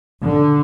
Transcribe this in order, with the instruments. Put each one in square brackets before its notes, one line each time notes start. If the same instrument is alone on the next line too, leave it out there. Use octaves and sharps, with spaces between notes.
[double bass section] D3